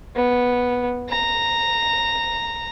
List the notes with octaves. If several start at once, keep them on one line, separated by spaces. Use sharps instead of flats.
B3
A#5